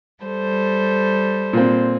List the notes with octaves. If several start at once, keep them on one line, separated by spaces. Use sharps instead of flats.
G3 A4 C5
A#2 C4